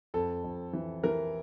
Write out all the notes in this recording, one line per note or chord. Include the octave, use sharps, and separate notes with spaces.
F2 A4
F2
E3
E3 A#4